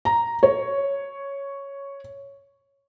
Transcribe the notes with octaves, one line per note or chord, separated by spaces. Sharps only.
A#5
C#5